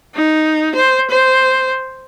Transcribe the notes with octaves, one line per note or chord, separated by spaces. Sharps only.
D#4
C5
C5